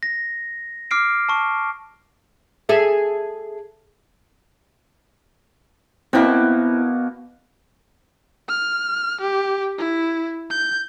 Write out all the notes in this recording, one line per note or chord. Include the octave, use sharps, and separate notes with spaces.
A#6
D6 F6 C7 D7
A5 C#6
G#4 A4 E5
B2 A#3 C4 E4
F6
G4
E4
G6